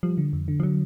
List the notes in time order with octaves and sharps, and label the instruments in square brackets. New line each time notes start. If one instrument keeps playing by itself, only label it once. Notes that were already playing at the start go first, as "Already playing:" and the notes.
[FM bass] F3 [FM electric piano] G3
[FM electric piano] D3
F2
D3
[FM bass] F3
[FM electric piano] D3 [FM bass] F#3